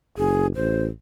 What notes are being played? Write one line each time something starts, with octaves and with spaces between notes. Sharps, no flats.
F#1 G#4
A1 C5